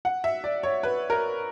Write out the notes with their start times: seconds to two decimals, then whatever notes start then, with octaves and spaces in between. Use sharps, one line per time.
0.05 F#5
0.24 E5
0.44 D5
0.63 C#5
0.83 B4
1.10 A#4